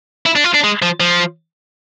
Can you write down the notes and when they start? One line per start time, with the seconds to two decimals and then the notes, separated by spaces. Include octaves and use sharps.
0.26 E4
0.36 D4
0.44 F4
0.54 D4
0.64 G#3
0.82 F3
1.00 F3